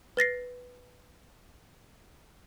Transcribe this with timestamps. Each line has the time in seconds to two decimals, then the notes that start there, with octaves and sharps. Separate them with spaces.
0.17 B4 A6 A#6 C7